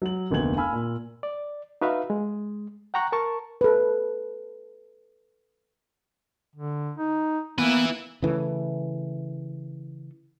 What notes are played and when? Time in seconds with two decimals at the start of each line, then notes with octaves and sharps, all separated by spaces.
0.02 F#3 F#7
0.30 F1 D2 A#3 B3 G#6 F#7
0.56 F5 G#5 B5 E6 F6
0.72 A#2
1.23 D5
1.81 D#4 F#4 B4 E5 F5
2.10 G#3
2.94 F#5 G5 A#5 C#6 F#6
3.12 A#4 A5 C#6
3.61 A4 B4
6.56 D3
6.98 D#4
7.58 A#3 B3 E4 B4
8.22 C#3 E3 A3